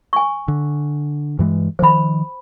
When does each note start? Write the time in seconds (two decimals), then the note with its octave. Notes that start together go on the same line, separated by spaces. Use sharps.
0.13 G#5 C#6
0.48 D3
1.39 G2 E3 G#3
1.79 D#3 F3 C5 B5